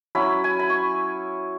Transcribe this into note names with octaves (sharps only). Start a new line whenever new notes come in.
F#3 C#4 E4 B5
G#5
B5
C#6